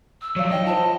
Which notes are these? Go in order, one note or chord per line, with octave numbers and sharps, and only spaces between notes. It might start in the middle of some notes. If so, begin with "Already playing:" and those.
E6
F3 F#3 C#5 D5 F5
D4 D#4 D#5 G5
F4 C5 A5